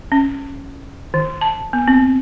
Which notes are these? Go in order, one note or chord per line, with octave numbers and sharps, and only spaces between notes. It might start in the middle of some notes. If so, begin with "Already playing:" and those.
C#4
D#3
A5
B3
C4